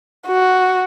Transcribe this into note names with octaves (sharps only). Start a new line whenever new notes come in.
F#4